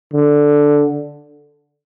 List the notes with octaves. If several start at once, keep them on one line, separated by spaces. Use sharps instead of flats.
D3